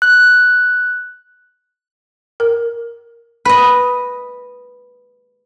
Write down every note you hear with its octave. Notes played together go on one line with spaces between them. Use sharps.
F#6
A#4
B4 D#5